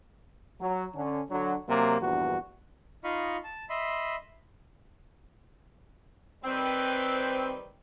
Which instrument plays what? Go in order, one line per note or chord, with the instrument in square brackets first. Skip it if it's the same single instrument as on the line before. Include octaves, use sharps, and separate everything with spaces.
[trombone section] F#3
D3 C#4
D3 F#3
C3 F#3 A#3
A#1 E2 G2 F#4
[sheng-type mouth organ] D#4 F4 D#5 F5 B5 C#6
A5
D#5 E5 B5 C6
[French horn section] D#3 G3 B4 [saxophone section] C4